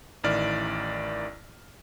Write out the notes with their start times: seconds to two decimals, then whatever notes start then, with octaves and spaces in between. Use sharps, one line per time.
0.24 A1 D#3 E4 D5 F6